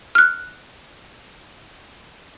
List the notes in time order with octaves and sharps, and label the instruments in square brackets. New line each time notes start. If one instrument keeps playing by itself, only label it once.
[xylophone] F6 F#6